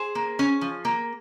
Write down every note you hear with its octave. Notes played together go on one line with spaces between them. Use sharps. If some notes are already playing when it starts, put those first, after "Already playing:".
Already playing: G#4 C5
A#3
C#4
F3
A#3